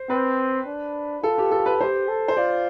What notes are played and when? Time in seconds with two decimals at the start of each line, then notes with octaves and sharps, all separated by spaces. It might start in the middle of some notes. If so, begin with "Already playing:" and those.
Already playing: C5
0.10 C4 B4
0.67 D4
1.23 F4 A4
1.38 G4
1.51 A4
1.66 B4
1.79 G4 C5
2.08 A4
2.28 C5
2.37 F4 D5